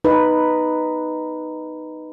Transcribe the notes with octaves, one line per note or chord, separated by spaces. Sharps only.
D#4 B4